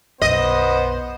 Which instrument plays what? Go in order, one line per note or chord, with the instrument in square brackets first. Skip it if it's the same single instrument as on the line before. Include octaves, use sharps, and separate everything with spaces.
[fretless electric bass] B1 F#2 [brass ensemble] B3 C5 [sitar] D#5